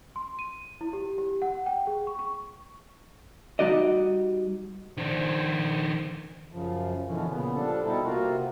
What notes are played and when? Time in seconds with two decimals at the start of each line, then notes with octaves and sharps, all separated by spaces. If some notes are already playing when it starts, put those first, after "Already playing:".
0.16 C6
0.39 D#7
0.81 E4
0.93 G4
1.18 G4
1.42 F#5
1.66 G5
1.87 G#4
2.07 C#6
2.19 C#6
3.59 G3 D#4 F#4 D5 D#5
4.97 D#3 D4 C5
6.52 F#2 C#3 F3
7.07 B2 D3 E3 F3 C#4
7.29 A#2 C#3 B3
7.55 F3 G3 D4 A4
7.84 B2 G3 D#4 E4 A4
8.04 C3 A#3 F4 F#4